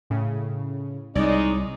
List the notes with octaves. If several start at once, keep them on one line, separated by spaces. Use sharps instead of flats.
A2 C#3
C2 G#3 D#4 C#5 D5